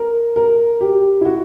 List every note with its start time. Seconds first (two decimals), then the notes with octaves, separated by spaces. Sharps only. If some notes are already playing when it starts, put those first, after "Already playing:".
Already playing: A#4
0.36 A#4
0.81 G4
1.21 E4
1.25 F#4